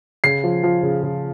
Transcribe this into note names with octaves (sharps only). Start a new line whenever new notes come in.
C#3 C7
F3
F3
C#3
C#3